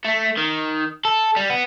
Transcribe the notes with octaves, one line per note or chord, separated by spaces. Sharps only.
A3
D#3
A4
G3
B3